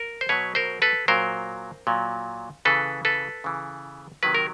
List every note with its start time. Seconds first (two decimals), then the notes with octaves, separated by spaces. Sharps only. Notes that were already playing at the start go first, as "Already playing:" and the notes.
Already playing: A#4
0.21 C5
0.29 B2 F#3 B4 C#5
0.55 A#4 C5
0.82 A4 B4
1.08 A#2 F#3 A#4 C5
1.87 A#2 F#3
2.65 C#3 E3 A4 B4
3.05 A4 B4
3.44 C#3 E3
4.23 C3 D#3 F#3 B4
4.35 A#4